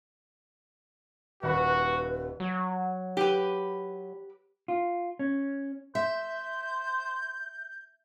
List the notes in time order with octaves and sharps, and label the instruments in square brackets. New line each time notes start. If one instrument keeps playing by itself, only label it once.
[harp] D#1 F#5 B5 [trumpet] F#4 [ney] B4
[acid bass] F#3
[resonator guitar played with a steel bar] G4 B4
[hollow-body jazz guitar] F4
C#4
[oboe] C5 [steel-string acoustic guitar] E5 [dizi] G6